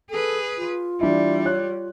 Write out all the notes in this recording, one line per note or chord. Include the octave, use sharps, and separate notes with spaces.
G#4 A4 B4
F4
E3 G3 D4 E4
C#5 F#6